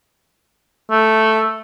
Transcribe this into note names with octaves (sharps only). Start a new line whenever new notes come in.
A3